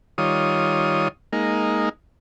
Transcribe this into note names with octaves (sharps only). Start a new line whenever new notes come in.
D#3 G3 F4 C#5 D#6
G#3 A#3 D#4